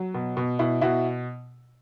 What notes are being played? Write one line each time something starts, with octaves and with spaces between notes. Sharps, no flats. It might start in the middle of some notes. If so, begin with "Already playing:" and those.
Already playing: F#3
B2
B2
B2 E4
B2 E4 F#4